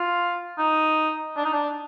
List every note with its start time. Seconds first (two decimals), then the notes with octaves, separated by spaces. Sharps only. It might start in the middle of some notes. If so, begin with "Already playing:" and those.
Already playing: F4
0.58 D#4
1.37 D4
1.45 D#4
1.53 D4